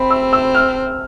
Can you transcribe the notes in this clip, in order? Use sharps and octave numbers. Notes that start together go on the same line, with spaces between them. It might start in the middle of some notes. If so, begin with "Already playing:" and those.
Already playing: C4 B5
E6
E6
F6